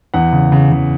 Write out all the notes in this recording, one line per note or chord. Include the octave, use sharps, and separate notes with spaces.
E2 F#5
C#3
C#3
C#3